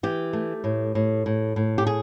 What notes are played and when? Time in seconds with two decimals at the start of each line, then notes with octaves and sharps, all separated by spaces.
0.03 E3 G4
0.33 A3
0.64 A2
0.95 A2
1.26 A2
1.56 A2
1.78 G4
1.87 G#4